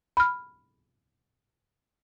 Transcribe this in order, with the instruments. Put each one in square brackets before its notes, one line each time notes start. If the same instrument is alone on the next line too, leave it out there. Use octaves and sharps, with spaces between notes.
[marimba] B5 F6